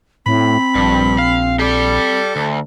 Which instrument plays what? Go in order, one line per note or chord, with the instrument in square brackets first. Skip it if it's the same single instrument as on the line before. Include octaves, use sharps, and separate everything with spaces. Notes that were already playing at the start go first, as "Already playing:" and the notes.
[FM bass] A2 [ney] C4 [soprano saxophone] B5
[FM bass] A#1 [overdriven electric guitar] G2
[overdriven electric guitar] F5
[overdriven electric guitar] G4 D5 [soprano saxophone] A4
[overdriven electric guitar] D2